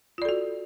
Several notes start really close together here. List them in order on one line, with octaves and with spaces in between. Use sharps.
F4 D5 A4 F#4